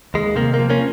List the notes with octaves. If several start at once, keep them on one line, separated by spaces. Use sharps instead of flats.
D#2 G#3
C3 A#3
F3 A#3
A#3 C#4